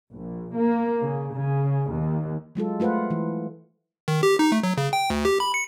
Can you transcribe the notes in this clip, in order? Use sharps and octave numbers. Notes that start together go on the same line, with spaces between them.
A#1
A#3
C#3
C#3
D#2
F#3 G#3 F4 A4
A3 F4 B4 C5 F#5
E3
D#3
G4
D#4
A3
F#3
C#3
G5
D2
G4
B5
C#7